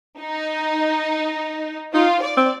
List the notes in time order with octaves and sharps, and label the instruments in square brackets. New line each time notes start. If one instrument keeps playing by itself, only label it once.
[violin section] D#4
[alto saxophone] D#4 [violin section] F4
[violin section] D5
[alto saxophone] C4